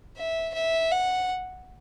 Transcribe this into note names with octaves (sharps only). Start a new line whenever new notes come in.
E5
E5
F#5